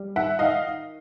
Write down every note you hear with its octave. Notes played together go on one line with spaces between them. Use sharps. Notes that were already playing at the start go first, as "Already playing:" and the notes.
Already playing: G3
D#3 E5 F#5
D#3 D#5 F5